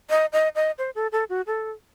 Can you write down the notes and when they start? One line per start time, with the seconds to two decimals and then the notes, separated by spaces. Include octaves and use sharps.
0.10 D#5
0.33 D#5
0.55 D#5
0.78 C5
0.95 A4
1.12 A4
1.29 F#4
1.47 A4